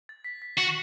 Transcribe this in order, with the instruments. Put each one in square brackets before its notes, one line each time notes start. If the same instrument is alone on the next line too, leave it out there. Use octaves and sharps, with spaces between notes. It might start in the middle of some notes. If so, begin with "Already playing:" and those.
[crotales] A6
B6
B6
[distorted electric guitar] F#4 [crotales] C#7